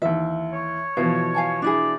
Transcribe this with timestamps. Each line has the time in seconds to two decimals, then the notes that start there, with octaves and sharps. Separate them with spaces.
0.02 D#2 E3 E5
0.53 C#5
0.97 B2 E3 F3 F5
1.34 F5 G#5 A5
1.62 D4 E4 G#4 D5